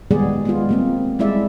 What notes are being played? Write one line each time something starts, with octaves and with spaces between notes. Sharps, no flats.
D#3 G3 G#3 B3 G#4 D5
G#3 B3 F4
G3 A#3 C4
G3 G#3 E4 D5 E5